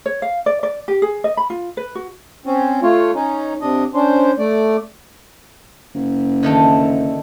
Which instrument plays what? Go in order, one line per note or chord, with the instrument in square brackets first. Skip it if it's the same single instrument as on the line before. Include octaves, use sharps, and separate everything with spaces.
[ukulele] C#5
F5
D5
D5
G4
G#4
D#5
B5
F4
B4
F#4
[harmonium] C4 C#4
A3 F4 C#5
C#4 D#4
C3 D4 D#5
C#4 D4 C5
A3 D5
[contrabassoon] F#1
[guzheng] D3 D#3 A3